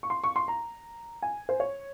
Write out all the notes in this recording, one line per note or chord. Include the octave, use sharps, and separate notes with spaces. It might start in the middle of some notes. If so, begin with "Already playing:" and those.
C#6
C6
C#6
C6
A#5
G#5
C5
C#5